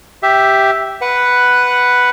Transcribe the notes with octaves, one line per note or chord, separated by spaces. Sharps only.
G4 E5
B4 F#5